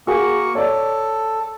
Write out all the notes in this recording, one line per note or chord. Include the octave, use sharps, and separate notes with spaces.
A#3 F#4 G#4 A#4 C#6
A4 C#5 D5